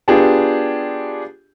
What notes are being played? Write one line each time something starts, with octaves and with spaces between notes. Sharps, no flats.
B3 D4 F4 G4 G#4